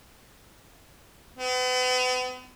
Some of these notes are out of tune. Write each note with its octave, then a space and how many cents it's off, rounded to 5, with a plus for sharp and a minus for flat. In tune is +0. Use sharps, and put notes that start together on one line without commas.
B3 +40